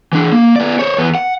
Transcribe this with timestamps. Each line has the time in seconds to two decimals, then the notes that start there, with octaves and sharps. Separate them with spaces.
0.13 E3 D4
0.32 A#3
0.56 B3 D5
0.79 C5 C#5
0.98 E2 B3
1.15 F#5